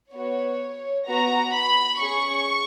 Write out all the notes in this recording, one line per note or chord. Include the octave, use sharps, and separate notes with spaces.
B3 F#4 C#5
B3 F#4 A#5
B5
C#4 G#4 C#6